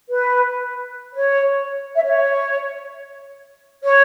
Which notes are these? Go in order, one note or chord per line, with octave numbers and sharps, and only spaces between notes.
B4
C#5
E5
C#5
C#5